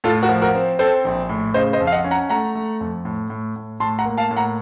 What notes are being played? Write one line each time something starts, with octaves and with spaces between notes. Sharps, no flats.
A2 F4 A4
F#4 A#4
F3
F#4 A#4
C4
C4 A4 C5
A#1
A2
C#3 C5 D#5
C5 D#5
F2
F5
D#5 F#5
C#4
F#5 A#5
A3 F#5 A#5
A3
F2
A2
A2
A2
A2 A5 C6
F#5 A#5
A#3
F5 A5
A2
F#5 A#5